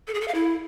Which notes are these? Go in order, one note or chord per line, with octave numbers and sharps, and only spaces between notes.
A4
G#4
A4
F5
E4